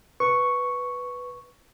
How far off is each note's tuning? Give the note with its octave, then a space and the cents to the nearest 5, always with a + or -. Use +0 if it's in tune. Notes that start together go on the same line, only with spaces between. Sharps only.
B4 +0 C#6 +0